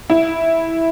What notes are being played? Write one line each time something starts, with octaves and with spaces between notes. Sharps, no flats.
E4